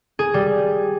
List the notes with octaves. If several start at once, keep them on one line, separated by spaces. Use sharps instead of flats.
G#4
G3